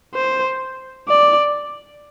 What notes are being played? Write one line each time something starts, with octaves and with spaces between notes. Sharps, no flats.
C5
D5